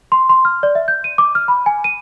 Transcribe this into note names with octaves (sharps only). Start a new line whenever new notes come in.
C6
C6
F6
D5
E5
G6
D#7
D6
F6
B5
G#5
D#7